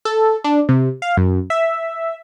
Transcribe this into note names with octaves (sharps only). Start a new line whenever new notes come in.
A4
D4
C3
F5
F#2
E5